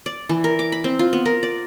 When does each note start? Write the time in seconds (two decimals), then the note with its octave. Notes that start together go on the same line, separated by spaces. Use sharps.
0.06 D5
0.29 E3
0.44 A#4
0.59 D6
0.72 B5
0.84 C4
0.99 F4
1.13 B3
1.26 A#4
1.43 D5